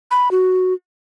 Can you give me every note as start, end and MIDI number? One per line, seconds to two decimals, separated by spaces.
0.11 0.31 83
0.31 0.74 66